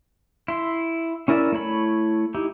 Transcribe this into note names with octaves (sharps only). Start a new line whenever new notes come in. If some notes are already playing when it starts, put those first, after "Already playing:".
E4 C6
C#4 E4 A#4 D5 E5
A3 E4 C#5 B5
D#4 E4 G4